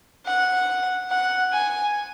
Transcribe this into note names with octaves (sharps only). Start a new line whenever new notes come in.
F#5
F#5
G#5